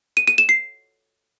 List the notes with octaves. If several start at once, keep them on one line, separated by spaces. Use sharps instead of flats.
D#7
D#7
E7
C7